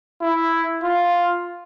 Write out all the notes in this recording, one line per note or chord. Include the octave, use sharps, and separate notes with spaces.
E4
F4